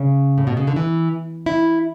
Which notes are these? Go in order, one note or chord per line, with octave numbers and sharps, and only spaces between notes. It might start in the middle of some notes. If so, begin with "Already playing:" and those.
Already playing: C#3
A2
B2
C#3
D3
E3
E4